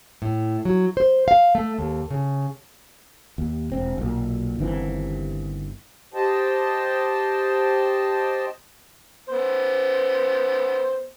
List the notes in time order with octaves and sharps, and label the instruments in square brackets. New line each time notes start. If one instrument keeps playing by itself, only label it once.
[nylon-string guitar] A2
F#3
C5
F5
A3
D#2
C#3
[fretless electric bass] D#2
E1 C4
B1 A#2
G1 D#3 E3 C4
[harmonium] G4 C5 D#5 G5 A5
[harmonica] B3 C5